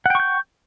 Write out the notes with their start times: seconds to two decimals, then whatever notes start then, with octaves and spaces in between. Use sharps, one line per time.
0.06 F#5
0.10 G5
0.15 C#6
0.20 G6